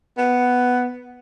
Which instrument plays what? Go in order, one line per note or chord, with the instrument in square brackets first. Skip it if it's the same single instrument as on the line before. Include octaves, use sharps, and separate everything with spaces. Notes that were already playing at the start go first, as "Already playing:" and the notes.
[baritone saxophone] B3